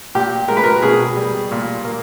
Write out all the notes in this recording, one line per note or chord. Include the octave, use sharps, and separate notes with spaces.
A#2 G4
G#3 A#4
B4
A#4
B2 G#4
G3
A#2
A#3